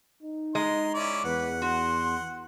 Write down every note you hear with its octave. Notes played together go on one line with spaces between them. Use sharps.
D#4
G#3 D#5 A#5 C6
C#4 E4 D5
E2 B4 F#5
F#4 C6